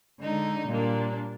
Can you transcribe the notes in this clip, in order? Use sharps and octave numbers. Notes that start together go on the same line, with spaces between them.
D3 G#3 D#4
A#2 G3 A#3 D4